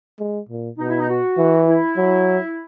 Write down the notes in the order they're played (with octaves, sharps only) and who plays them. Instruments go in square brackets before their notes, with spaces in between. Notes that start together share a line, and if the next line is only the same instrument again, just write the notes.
[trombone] G#3
A#2
[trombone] B2 [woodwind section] D#4
[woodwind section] E4
D#4
F#4
[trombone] E3
[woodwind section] E4
[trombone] F#3